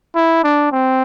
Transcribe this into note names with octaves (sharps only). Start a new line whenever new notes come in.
E4
D4
C4